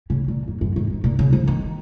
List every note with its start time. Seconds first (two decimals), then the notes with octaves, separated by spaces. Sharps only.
0.10 C#3
0.28 A#2
0.48 F#2
0.61 F#2
0.76 G#2
0.90 G#2
1.04 A#2
1.19 C#3
1.33 F3
1.47 D#3